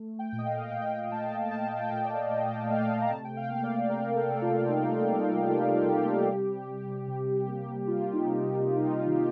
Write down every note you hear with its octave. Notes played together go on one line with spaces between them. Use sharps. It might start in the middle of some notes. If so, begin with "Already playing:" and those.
Already playing: A3
G5
A#2
D#5
F5
A#2 G5
A3 A5
A3 A5
A5
G5
A#2
D5
A3 D#5
G5
A3 F5
A#5
C3 A5
G5
F5
A#3
D5
A#3 A#4
A4
C3
F4
G3 D#4
A#3 D#4
G4
C3 F4
C3 G4
G3
C3
C3
A#3
A#3 F4
D#4
C3
D#4
A#3 F4
D#4
F4
F4
D#3 G4